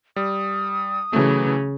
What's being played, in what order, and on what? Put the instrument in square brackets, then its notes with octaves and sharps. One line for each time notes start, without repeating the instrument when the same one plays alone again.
[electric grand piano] G3 [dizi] D#6
[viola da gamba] C#3 [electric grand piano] E3 F#3 A3